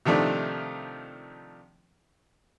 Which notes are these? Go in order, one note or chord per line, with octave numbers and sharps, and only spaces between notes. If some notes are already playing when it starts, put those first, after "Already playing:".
C3 D#3 F3 A3 D4